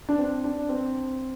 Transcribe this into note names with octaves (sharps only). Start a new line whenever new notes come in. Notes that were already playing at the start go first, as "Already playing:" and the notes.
D4
C4
D4
C4